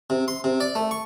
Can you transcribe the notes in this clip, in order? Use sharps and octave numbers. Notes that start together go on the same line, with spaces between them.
C3
C6
C3
D5
A3
C#6